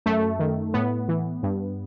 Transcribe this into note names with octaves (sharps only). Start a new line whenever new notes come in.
F#2 A3
D#3
A2 B3
E3
G2